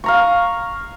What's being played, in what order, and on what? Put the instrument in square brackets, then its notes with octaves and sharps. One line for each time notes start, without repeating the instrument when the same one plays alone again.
[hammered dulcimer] F5 A#5 C#6